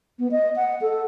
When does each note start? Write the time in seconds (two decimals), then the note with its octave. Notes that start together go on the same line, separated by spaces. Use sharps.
0.19 B3
0.31 D#5
0.56 F#5
0.81 A4